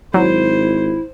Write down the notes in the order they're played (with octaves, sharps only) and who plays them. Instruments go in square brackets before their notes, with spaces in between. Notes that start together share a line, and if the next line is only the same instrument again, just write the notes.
[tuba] G#1 [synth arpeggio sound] F#3 [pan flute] E4 [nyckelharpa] C5